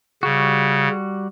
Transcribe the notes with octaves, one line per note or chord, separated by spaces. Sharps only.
C#3 G3 F#4